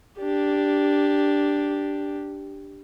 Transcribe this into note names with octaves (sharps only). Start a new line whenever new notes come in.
D4 G4